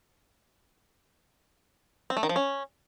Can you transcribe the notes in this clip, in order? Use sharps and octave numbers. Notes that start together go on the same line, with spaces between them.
C4
A3
D#3
F3
C#4